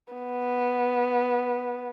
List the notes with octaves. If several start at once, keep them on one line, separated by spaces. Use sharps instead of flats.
B3